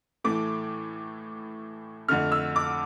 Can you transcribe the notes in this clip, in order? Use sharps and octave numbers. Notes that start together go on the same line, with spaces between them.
A2 E3 A3 D6
F2 D3 A3 F6
E6
D6